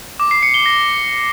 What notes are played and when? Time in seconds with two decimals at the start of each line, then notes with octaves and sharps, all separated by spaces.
0.20 D6
0.31 C7
0.43 C#7
0.54 G7
0.66 A#6